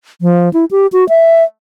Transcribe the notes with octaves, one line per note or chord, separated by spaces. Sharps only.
F3
E4
G4
F#4
E5